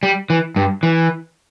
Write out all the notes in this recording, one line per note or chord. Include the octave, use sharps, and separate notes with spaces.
G3
E3
G2
E3